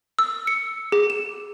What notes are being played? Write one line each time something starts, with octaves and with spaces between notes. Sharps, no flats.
E6
C#7
G#4
E7